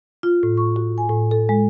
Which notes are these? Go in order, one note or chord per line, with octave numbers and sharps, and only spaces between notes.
F4
A2
C#6
F#4
G#5
A2
A4
G#3